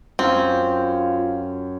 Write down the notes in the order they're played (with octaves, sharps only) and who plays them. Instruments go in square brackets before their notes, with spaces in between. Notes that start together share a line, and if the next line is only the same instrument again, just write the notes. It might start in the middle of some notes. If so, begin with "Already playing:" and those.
[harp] F#2 [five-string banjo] C4 [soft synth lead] F4